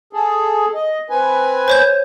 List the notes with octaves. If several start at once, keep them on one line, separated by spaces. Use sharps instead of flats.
G#4 A4
D#5
C4 B4 G#5
C5 C#5 G6